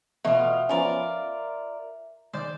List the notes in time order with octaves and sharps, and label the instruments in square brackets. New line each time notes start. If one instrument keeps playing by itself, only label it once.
[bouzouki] B2 F4 [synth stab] E3 A3 B3 [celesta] E5
[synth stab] F3 B3 C#4 [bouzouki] F4 A#4 D5
[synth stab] D#3 G#3 [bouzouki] C5 D5